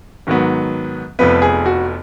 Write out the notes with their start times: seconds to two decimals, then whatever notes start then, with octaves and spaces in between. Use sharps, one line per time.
0.27 G#2 D#3 F#3 B3
1.19 F1 F2 F3 B3 B4
1.42 G#4
1.66 F#4